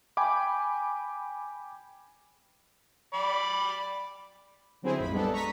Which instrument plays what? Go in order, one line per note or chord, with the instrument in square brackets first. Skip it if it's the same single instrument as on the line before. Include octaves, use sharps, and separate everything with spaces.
[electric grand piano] G5 G#5 B5 D6
[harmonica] D5 B5
[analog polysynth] D3 F#3 C4 E4 G#4 C5
A#1 F2 A2 B5
G3 G#3 B3 D4 A4
A#5 C#6 B6 D#7